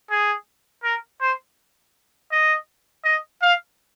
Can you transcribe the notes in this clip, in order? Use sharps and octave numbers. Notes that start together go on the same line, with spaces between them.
G#4
A#4
C5
D#5
D#5
F5